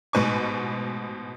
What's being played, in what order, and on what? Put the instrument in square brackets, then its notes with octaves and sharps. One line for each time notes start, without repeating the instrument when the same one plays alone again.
[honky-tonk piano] A1 G#2 B2 B4 G#5 C#6